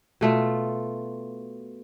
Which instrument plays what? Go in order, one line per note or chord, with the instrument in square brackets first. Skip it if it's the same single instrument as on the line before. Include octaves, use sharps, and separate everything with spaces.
[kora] B2 A3 F4